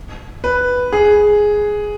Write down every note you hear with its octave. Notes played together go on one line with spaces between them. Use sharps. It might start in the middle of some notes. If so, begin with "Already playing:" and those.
B4
G#4